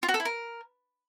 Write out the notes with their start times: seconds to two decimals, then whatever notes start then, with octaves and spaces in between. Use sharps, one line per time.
0.03 F4
0.08 F#4
0.14 A4
0.20 E4
0.25 A#4